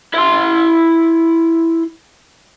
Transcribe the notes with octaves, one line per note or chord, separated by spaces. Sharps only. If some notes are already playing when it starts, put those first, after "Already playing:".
E4 C6